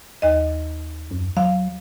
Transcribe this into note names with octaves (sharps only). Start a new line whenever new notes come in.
D#2 D#5
F#2
F#3 F5